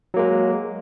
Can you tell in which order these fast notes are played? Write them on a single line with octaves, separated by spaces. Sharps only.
F#3 A#3 G#3